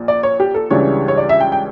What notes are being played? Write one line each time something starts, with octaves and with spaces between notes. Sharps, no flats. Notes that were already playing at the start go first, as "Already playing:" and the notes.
Already playing: A#1 A#2
D5
C#5
G4
A4
C#2 C#3 E3 G3 D4 C#5
C#5
D5
E5
G5
G5